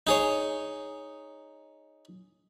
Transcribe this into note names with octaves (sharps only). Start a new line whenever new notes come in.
D#4 G#4 C#5